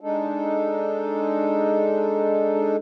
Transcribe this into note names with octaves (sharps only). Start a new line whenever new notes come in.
G#3 D4 D#4 A4